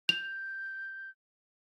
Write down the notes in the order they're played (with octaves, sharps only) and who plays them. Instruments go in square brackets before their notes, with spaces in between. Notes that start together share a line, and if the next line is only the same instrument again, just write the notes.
[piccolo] G6 [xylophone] F7